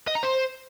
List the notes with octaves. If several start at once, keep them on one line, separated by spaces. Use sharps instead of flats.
D#5
A#5
C5